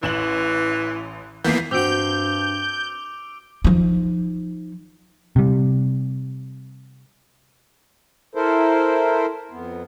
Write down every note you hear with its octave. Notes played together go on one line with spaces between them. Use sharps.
A1 E3 E7 F#7
E3 A#3 B3 G6 B6 C7
G2 C4 F#4 D6 E6 G6 D7
F3 D#4
C3 G3
E4 A4 A#4 C5
F2 B3